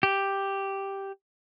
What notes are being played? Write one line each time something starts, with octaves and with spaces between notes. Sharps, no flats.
G4